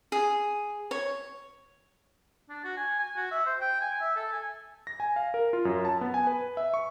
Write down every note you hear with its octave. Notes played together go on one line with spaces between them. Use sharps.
G#4
C#5
D4
F#4
G#5
G#5
F#4
E5
C5
G5
G#5
E5
A4
G#5
A#6
G#5
F5
A#4
F4
F#2
A5
B3
G#5
B4
E5
C#6